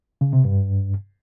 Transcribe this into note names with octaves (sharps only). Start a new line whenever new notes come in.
C#3
C3
G2